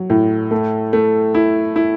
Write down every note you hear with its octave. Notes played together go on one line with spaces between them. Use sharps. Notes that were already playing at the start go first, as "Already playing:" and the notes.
Already playing: F#3
A2
A3
A3
E4
E4